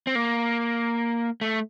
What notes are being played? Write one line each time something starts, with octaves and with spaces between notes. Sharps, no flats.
C4
A#3
A3